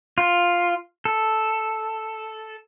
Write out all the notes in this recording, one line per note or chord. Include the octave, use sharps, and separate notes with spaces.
F4
A4